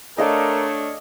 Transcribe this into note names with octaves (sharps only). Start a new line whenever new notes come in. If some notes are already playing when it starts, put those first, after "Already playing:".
A3 D4 A#4 C#5 D#5 F5 D6